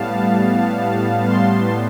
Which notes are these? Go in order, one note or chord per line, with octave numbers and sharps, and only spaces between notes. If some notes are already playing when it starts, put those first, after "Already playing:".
Already playing: A2 G3 B3 F5 A5
A5 C6